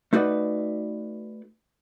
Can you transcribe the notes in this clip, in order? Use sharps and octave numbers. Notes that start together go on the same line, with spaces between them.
A3 D#4 F#4 B4 D5